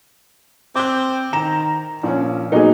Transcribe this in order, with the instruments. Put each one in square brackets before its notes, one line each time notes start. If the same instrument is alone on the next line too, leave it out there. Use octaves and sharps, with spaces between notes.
[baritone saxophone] C4 [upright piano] D6 G6
[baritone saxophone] D#3 [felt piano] A#5 [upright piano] E7
[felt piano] A#1 C#4 [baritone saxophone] F3
[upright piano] A#2 F#3 D#4 [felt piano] B3 G#4